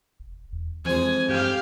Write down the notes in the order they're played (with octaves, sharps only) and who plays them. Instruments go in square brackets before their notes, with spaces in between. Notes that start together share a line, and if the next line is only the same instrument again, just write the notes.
[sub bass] E1
E2
[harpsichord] F2 G#3 [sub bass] E3 [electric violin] G#5
[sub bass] G2 [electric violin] G4 F5